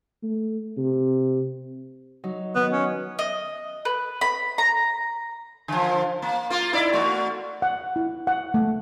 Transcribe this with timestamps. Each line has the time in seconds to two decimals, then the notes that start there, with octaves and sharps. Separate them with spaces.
0.23 A3
0.77 C3
2.24 F#3 D#4
2.55 D#3 B3
2.72 C#4
3.19 D#5
3.85 B4
4.21 B5
4.58 A#5
5.68 D3 F3
6.22 A#3
6.50 A#3 F4
6.73 D#4 E4 D5
6.93 A3 F#4
7.62 F#5
7.96 E4
8.27 F#5
8.54 A3